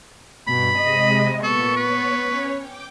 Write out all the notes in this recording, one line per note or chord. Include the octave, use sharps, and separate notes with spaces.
G2 B2 B5
C3 G#3 D#5
A#2 B3 A4 C#6
B4 C#5
C#4 C#5
G5 D6